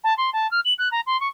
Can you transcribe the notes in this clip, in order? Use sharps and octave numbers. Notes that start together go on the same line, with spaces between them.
A5
C6
A5
F6
F#7
F#6
A#5
C6
C#6